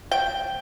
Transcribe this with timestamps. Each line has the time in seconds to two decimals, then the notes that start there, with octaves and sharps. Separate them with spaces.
0.11 G5